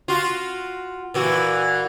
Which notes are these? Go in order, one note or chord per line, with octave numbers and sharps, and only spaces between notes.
F4 F#4
A#2 E3 F#4